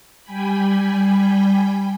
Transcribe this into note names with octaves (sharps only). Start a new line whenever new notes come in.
G3 G5 G#5 B5